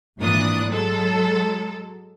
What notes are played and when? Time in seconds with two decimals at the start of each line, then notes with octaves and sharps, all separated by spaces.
0.18 G#1 A#2 E3 D4 D#6 F#6
0.67 F#3 G#3 A4